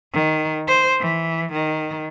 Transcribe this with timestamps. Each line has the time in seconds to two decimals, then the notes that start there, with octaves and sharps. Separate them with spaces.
0.13 D#3
0.68 C5
1.00 E3
1.53 D#3